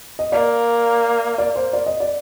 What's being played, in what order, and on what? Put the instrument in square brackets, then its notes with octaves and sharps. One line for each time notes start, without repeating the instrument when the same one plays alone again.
[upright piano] D#5
[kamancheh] A#3 [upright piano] D5
[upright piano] D5
C5
D5
D#5
D5